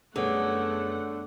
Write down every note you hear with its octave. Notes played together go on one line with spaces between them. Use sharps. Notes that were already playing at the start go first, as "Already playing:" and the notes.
F#2 D3 G3 A3 B3 G#4 C#5 F#5